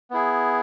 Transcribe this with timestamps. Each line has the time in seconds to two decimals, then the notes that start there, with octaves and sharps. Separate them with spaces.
0.11 B3 E4 G#4